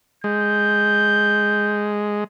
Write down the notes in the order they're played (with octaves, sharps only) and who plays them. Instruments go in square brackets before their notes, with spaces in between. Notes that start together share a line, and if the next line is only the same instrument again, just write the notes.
[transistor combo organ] G#3 [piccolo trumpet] G6